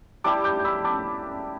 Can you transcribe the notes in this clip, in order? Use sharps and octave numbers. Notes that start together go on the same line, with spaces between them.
G3 E4 G4 A5 D6
D6 G6
G6
B5 E6
A5 D6